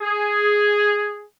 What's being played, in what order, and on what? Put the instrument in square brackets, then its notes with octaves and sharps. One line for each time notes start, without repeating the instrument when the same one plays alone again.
[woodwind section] G#4